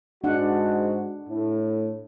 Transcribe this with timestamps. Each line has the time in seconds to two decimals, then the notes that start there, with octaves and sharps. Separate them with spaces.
0.24 G#2 G#3 D4 F#4 F#5
1.29 A2